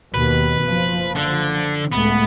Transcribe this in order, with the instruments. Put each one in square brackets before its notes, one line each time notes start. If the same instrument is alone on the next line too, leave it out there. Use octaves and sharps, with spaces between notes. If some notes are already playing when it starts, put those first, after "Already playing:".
[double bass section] D#2 B2 D#3 [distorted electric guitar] B4
[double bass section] F#1 F3
[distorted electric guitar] D3
[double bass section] C#2 A2 A3 [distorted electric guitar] B3